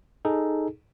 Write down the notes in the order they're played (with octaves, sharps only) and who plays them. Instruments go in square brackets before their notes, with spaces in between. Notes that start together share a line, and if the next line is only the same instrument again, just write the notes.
[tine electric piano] D#4 G#4 A4